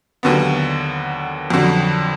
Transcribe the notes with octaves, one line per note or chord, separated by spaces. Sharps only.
D#2 D3 F#3 B3
F2 D3 F#3